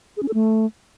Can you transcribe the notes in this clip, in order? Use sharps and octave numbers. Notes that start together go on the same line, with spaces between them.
G#4
C#4
A4
A3